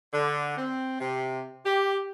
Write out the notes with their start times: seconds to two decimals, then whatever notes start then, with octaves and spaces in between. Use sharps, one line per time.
0.13 D3
0.57 C4
1.00 C3
1.66 G4